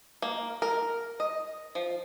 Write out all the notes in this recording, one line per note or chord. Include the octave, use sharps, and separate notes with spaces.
A#3
A#4
D#5
F3